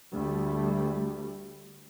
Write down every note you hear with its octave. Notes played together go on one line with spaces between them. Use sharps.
D2 G3 A3